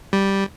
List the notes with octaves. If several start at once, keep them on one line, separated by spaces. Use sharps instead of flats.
G3